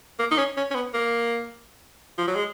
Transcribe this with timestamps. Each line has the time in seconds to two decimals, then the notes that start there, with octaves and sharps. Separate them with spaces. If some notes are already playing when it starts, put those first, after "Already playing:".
0.19 A#3
0.31 D#4
0.38 C#4
0.57 C#4
0.71 C#4
0.75 B3
0.94 A#3
2.19 F3
2.28 F#3
2.35 G#3